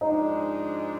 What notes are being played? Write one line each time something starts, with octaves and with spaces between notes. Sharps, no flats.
G#2 F3 G#3 D4 D#4